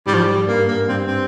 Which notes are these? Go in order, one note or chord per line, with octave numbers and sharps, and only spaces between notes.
G#2 G3
F3
G3
G2 A#3
A#3
G2 C4
C4